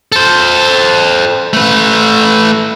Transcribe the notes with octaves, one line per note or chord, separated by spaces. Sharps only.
A4 C5
A3 B4